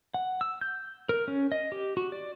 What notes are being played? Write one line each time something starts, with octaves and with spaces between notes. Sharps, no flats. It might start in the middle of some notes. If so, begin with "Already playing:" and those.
F#5
E6
G6
A#4
C#4
D#5
G4
F#4
D5